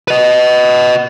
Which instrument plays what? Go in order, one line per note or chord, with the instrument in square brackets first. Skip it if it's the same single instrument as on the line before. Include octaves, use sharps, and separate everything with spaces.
[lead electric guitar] B4 D#5